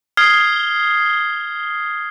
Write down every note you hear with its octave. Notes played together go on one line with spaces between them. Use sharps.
D#6 F6 G#6 C7 G7